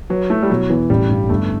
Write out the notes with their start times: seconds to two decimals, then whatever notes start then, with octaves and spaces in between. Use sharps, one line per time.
0.10 F#3 B4
0.30 A3 E4
0.42 G3
0.50 B2 F#3
0.70 E2 E3
0.90 A1 G3
1.09 G2
1.29 G1 A3